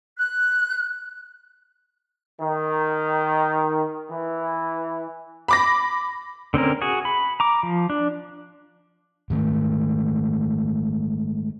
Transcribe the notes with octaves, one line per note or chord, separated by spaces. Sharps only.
F#6
D#3
E3
B5 D6 A#6
D3 C4 C#4 A#4
F#4 G#4
B5
A#5 D6
F3
D4
G#2 D#3 A3